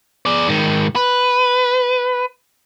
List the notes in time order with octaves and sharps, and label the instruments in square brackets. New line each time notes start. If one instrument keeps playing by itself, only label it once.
[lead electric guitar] G#4 D5
G#2 D#3
B4